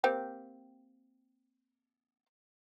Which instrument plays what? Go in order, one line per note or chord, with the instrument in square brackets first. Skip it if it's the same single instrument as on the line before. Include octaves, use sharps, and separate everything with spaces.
[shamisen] A#3 C4 G4